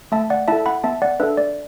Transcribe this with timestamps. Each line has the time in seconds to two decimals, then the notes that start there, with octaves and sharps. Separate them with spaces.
0.12 A3 E5 A5
0.30 D5 F#5
0.48 E4 A4 E5 A5
0.66 F#5 B5
0.84 B3 E5 A5
1.02 D5 F#5
1.20 D4 A4 B4 E5
1.37 D5